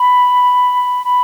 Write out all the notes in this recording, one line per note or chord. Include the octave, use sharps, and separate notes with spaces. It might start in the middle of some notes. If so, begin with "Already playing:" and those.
Already playing: B5
B5